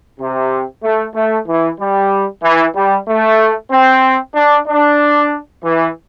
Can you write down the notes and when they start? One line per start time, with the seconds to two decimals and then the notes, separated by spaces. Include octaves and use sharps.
0.20 C3
0.84 A3
1.15 A3
1.47 E3
1.80 G3
2.43 E3
2.75 G3
3.08 A3
3.71 C4
4.35 D4
4.68 D4
5.64 E3